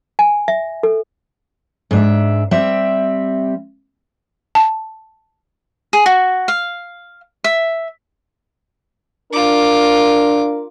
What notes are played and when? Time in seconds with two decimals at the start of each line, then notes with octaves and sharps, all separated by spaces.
0.19 G#5
0.48 E5
0.83 A4
1.91 G#2 D4 E5
2.51 G3 C4 E5
4.55 A5
5.93 G#4
6.06 F#4
6.48 F5
7.44 E5
9.32 D4 F4 A#4 D6